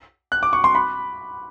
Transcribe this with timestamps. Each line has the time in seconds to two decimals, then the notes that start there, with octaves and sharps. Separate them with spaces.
0.32 F#6
0.43 D6
0.53 C#6
0.64 C6
0.75 B5